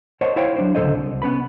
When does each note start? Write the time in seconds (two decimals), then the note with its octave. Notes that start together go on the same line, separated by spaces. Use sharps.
0.21 A#4 C5 C#5 D#5 F#5 A5
0.36 E4 C5 C#5 F5 G5
0.56 F#3 D4 C5
0.75 C#2 D3 D#3 A4 C5 D#5
0.95 C2
1.22 B3 C#4 B4 B5